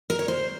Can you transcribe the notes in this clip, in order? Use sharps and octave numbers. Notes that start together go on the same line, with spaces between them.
A#4
C#5
C5